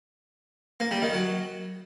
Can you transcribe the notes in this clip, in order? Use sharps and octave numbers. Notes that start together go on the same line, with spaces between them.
A#3
G3
D#3
F#3